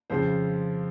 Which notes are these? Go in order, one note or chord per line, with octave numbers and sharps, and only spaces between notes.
F2 C#3 F3 C5